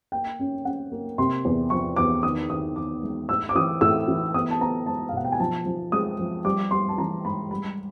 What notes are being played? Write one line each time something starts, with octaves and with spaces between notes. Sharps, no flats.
A#3 G5
C#4
C#4 F#5
A#3
C3 C6
E2
F3 C#6
E2 D6
D#3 D#6
D#3 D#6
D#3 D6
G#3
A2 E6
D6
E3 D#6
A2 E6
E3
B3 D#6
A5
B3 A#5
G#3 A5
F5
B2 F#5
G5
G#5
F3 A5
F3
G#3 D#6
F3
G3 D6
G3 C6
A5
E3 A#5
G#2 B5
G3 B5